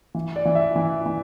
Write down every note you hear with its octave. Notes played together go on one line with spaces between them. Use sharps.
E3
D5
E3
E5
E3
E3